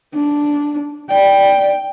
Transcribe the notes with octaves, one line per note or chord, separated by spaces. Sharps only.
D4
D5 G5